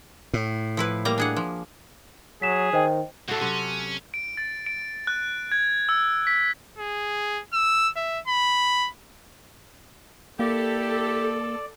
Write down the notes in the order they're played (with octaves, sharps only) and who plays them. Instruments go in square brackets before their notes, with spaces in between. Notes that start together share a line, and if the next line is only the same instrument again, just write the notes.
[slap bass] A2
[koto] F3 E4 B4
G3 A#3 A#5
D4 G#4 F#5
F3
[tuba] F#3 [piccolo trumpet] G#4 [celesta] B6 E7
[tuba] D#3 [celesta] C5 D#5 G5
[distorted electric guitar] C2 A2 [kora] F#4 A4
[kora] C3 F#3 [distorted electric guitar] C#4
[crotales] D7
A6
D7
F#6
G#6
E6
B6
[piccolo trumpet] G#4
E6
E5
B5
[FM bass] A#3 [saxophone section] E4 G4 [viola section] A4 [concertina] D5